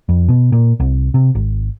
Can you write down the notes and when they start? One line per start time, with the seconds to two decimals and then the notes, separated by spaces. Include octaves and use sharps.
0.09 F2
0.29 B2
0.52 A#2
0.80 C2
1.14 C3
1.35 G#1